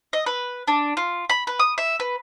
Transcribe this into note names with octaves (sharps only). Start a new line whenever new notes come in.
D#5
B4
D4
F4
B5
B4
D#6
E5
B4